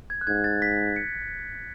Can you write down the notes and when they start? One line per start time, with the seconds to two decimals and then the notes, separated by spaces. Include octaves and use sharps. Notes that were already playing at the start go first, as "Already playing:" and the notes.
0.10 G#6
0.21 F#6
0.27 G#2 G#6
0.44 A6
0.62 B6
0.96 C#7